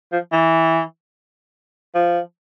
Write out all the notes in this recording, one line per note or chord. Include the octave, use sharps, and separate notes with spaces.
F3
E3
F3